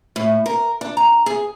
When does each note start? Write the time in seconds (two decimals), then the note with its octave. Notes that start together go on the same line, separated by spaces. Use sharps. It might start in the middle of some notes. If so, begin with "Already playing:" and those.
0.16 A2
0.46 A#4
0.81 D4
0.97 A#5
1.26 G#4